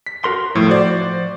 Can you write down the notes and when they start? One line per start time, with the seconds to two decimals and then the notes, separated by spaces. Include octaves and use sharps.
0.06 B6
0.24 F#4 A#4 C6
0.55 A2 F3 A3
0.68 F#4 C5 D5